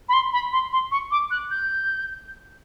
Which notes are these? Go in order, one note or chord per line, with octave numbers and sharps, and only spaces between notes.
B5
C6
B5
C6
C6
C#6
D6
F#6
G6